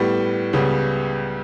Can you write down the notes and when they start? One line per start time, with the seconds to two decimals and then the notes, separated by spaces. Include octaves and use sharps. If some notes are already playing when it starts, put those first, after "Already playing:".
Already playing: A2 G3 B3
0.53 C#2 C#3 G3 B3